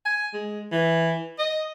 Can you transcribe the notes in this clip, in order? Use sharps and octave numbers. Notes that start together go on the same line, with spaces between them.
G#5
G#3
E3
D#5